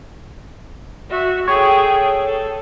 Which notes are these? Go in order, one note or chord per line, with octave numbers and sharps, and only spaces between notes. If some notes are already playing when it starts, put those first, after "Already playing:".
F#4 E5
G#4 A4 C#5 G5
A4